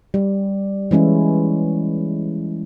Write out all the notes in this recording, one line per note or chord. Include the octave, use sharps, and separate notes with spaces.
G3
E3 G#3 C#4 E4